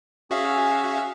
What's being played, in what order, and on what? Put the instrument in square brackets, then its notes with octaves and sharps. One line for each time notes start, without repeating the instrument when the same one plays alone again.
[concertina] C#4 G#4 [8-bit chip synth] F#4 E5 F5